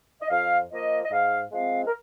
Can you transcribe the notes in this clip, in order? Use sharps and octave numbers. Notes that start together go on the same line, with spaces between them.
D#5
F2 F5
F3 A#3 D#5
D#5
G#2 F5
F3 G#3 C4 F5
A#4